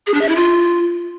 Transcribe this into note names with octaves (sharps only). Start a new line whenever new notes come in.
G#4
D4
E5
E4
F4